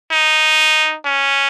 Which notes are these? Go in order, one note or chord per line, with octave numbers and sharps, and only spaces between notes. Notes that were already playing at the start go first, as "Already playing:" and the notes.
D#4
C#4